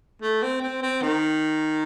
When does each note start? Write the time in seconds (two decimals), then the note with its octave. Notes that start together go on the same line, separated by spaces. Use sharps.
0.22 A3
0.43 C4
0.62 C4
0.82 C4
1.02 D#3